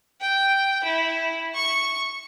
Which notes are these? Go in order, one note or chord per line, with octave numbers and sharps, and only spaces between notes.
G5
E4
C#6